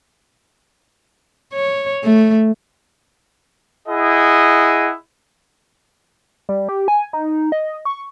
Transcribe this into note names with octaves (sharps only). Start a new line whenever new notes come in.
C#5
A3
E4 G#4 D#5 F#5
G3
G4
G#5
D#4
D#5
C#6